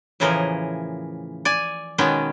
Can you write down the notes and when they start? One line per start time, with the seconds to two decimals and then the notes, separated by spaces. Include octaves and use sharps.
0.20 A2 C#3 E3 F3 A#4 D#5
1.45 D5 G#5
1.98 B2 D#3 G#3 B3 C#4 G5